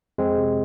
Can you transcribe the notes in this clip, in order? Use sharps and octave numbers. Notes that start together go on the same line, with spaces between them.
F2 G#3 C4
C3